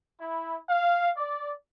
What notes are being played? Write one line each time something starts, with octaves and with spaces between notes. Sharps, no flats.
E4
F5
D5